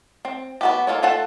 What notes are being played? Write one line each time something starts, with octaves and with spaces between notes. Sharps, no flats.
C4
B3 F#4 G4
A#3 F4 A4 C#5
A3 F4 A4 F#5 A5